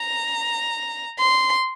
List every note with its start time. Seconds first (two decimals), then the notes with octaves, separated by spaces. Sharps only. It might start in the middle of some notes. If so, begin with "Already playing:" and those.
Already playing: A#5
1.19 C6